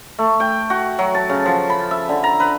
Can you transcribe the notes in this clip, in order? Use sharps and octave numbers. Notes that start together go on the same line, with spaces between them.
A3
G5
F#4
F#3
A5
C#3
F3
B5
E5
D3
A#5
B4